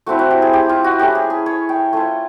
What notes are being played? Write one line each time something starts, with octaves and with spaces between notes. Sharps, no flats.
A3 C4 E4 F#4
F#4
G4
G#4
G4
F4
F#4
A3 C#4 E4 G4
G#4
G#4
C#5
G5
A3 C#4 F4